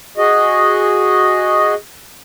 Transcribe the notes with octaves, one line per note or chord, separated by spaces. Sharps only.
F#4 G#4 D#5